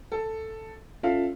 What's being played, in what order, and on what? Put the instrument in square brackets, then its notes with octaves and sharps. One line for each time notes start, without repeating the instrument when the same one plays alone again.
[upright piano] A4
[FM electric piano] C#4 F4 [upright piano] A4 E5 F5